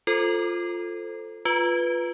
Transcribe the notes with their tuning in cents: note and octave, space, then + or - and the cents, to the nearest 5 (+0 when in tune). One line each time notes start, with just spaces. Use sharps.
F4 +0 A4 +5 C5 +0
F4 +0 B4 +0